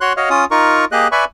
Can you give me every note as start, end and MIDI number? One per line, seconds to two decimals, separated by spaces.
0.01 0.13 66
0.01 0.13 73
0.01 0.13 84
0.01 0.13 90
0.17 0.29 66
0.17 0.29 73
0.17 0.29 75
0.17 0.29 77
0.30 0.45 61
0.30 0.45 65
0.30 0.45 87
0.51 0.85 63
0.51 0.85 65
0.51 0.85 70
0.51 0.85 85
0.92 1.08 58
0.92 1.08 67
0.92 1.08 68
0.92 1.08 75
0.92 1.08 90
1.12 1.25 71
1.12 1.25 74
1.12 1.25 76
1.12 1.25 80
1.12 1.25 83
1.12 1.25 85